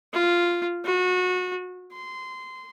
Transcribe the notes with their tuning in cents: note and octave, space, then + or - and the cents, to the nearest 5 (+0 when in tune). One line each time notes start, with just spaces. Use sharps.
F4 -5
F#4 -25
C6 -20